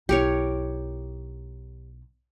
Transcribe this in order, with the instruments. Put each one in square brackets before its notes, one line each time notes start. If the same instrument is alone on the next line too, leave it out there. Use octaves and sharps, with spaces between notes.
[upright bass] B1 E4 [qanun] G4 A#4 C#5